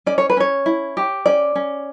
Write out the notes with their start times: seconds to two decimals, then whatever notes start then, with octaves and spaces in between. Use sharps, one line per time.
0.06 C#4 D5
0.18 C#5
0.30 B4
0.37 C#4 C#5
0.66 E4
0.97 G4
1.26 C#4 D5
1.56 C#4